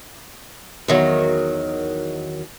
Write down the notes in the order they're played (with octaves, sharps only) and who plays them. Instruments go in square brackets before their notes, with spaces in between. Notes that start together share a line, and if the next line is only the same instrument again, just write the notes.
[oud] E2 D#3 F#3